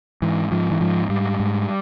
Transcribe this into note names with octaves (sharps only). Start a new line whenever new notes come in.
G#2 E3
G#2 F3
E3
G#2 F3
G#2 G3
G#2